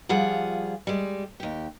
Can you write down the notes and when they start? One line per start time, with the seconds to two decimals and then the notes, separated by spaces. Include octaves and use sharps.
0.09 F3 G3 F4 G#4 F#5
0.87 G3 G#3
1.40 D#2 G4